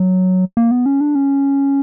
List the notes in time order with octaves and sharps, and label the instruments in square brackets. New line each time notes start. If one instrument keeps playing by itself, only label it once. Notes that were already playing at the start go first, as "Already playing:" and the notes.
Already playing: [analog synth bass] F#3
A#3
B3
C#4
D4
C#4